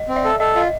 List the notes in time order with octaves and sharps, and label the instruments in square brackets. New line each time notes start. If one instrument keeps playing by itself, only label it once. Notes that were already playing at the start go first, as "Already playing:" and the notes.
Already playing: [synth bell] D#5
[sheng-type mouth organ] C4
[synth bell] D5 E5
[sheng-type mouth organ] A4
[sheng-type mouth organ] A4 [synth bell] D#5
[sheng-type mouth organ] F4 [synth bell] D#5